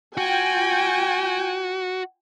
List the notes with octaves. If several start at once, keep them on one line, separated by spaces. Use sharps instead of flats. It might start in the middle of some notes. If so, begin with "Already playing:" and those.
F4 F#4 G5 G#5